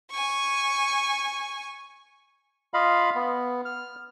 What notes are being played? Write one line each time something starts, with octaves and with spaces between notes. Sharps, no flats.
G#5 C#6
F4 D#5 F5 B5
B3
F6